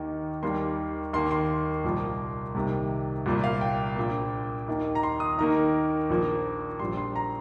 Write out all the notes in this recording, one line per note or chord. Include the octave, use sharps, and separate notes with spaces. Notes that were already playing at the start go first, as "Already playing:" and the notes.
Already playing: D#2 D#3 A#3
D#2 D#3 G3 A#3 C6
D#2 D#3 A#3 C6
C6
C2 A#2 F3 A#3
C2 C3 D#3 A#3
C2 A#2 A#3
F5
G5
A#1 A#2 A#3
D#2 D#3 A#3
A#5
C6
D#6
D#2 D#3 A#3 A#5
A#1 A#2 F3 A#3
A#1 A#2 G3 C6
C6
A#5